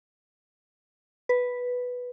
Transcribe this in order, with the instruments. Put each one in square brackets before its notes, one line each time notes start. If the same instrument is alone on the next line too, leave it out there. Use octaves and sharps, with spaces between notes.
[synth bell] B4